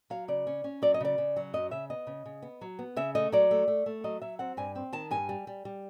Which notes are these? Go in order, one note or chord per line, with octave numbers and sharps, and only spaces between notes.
F#3 F5
C#3 D5
C#4
C#4
F#3 D5
D#5
C#3 D5
C#3
F#3
F#2 D#5
C#3 E5
B3 D#5
C#3
C#3
B3
F#3
B3
C#3 E5
A3 D#5
F#3 D5
A3
A3
A3
F#3 D#5
F#3 E5
C4 F#5
G2 G#5
C4
D#3 A5
G2 G#5
G3
G3
G3